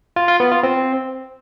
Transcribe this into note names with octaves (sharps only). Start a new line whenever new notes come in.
F4
F4
B3
F4
C4